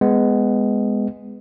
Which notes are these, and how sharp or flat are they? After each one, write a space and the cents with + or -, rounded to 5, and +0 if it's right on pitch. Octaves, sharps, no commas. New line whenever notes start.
G#3 +0 B3 +15